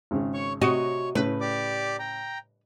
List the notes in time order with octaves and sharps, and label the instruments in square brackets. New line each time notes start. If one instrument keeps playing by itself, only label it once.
[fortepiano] G#1 C#3
[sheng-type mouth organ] C#5 C#6
[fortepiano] C3 [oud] F#4 D#5 [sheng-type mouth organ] C#5 C#6
[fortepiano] A2 C#3 [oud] B4
[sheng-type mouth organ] G4 D5 D6
G5 A#5